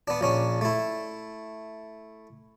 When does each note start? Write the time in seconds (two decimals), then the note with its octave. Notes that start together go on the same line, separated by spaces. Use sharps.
0.08 B3 D4
0.21 A#1 C#4 D4
0.61 A3 E4